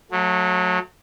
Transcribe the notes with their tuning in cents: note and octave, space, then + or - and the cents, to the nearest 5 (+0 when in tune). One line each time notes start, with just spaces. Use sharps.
F#3 -25 A3 +0